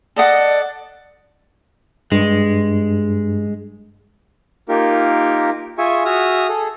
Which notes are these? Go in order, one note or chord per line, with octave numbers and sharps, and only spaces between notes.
A4 D5 D#5 F#5
G2 G#3
A#3 D#4 F4 G4 A#4
F4 G#4 E5 G#5 C#6
F#4 G#4 E5 D#6 F6
G#4 A4